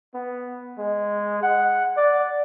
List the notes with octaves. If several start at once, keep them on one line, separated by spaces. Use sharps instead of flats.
B3
G#3
F#5
D5